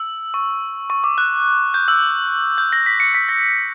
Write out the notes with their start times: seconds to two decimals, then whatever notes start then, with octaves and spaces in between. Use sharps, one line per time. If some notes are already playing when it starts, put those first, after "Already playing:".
Already playing: E6
0.34 C#6
0.90 C#6
1.04 D6
1.18 F#6
1.74 G6
1.88 E6
2.58 G6
2.73 A#6
2.86 B6
3.00 C#7
3.14 B6
3.29 A#6